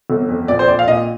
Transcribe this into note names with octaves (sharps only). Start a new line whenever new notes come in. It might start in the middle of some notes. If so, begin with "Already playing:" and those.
G1
F2
A#1 D5
C5
A#1 D5
F5
A#2 D#5